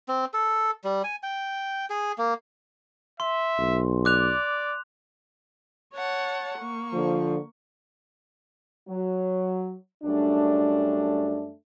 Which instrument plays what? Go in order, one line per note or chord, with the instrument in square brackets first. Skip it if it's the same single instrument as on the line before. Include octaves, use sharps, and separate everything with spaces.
[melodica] C4
A4
G3
G#5
G5
G#4
A#3
[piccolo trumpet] E5 [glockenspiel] C6
[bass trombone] B1
[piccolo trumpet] D5 [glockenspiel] D6 F#6 F7
[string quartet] C#5 F#5 A5
A#3 C#6
[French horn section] D3 F3
F#3
F#2 G3 A3 D4